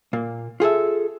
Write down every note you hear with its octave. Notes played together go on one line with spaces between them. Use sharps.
A#2 A#3
F4 G#4 A4 E5